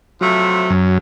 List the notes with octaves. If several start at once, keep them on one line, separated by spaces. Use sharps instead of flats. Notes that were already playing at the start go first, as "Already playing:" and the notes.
C3 F3 F#3 A3
F#2